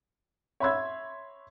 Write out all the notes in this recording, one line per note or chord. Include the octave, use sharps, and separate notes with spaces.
C#5 E5 B5 C6 E6 G#6